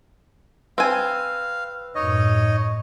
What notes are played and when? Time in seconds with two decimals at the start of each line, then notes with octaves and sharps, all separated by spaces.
0.78 C4 B4 F5 G#5 E6
1.95 F#2 A2 D#4 C#5 D#5